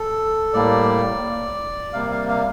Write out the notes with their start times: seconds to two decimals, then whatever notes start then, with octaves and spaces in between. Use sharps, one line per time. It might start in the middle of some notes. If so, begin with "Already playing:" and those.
Already playing: A4
0.53 A2 G3 A#3 D5
1.93 C3 G3 A#3 F5
2.11 F5
2.28 F5